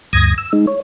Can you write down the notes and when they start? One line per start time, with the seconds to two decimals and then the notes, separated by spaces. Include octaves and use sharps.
0.13 D2 G2 D#6 G#6 A#6
0.38 E6
0.53 G#3 D#4
0.67 C#5